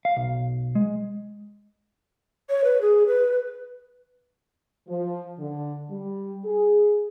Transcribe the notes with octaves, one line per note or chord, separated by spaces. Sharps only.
F5
B1
G#3
C#5
B4
G#4
B4
F3
D3
G3
G#4